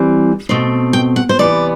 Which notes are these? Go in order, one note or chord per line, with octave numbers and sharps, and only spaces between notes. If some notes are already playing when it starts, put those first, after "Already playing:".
Already playing: E3 G3 C4
B2 A3 C4
G5
F#5
C5
C3 E3 B3 D5